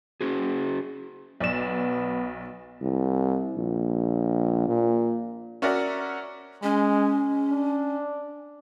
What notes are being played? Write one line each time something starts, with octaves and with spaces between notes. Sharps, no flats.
C#4 F#4 G#4
B1 B3 D5 E7
C2
A#1
A#2
C#4 F#4 A#4 D5 E5
G#3 C#4
D4